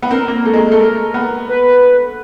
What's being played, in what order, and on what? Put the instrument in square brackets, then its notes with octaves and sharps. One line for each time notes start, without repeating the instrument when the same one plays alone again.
[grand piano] B3
[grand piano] C4 [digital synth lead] A#4
[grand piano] A#3
A3
G#3
[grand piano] A3 [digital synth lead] A4
[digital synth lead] A#4
[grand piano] B3
[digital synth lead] B4